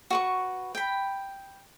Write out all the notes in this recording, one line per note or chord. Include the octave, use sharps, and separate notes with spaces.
F#4 B4 C#6
G5 B5